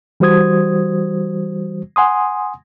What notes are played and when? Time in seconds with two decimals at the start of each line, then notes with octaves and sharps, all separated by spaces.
0.20 E3 G3 F#4 C5 D#6 G#6
1.96 F#5 G#5 C6 D#6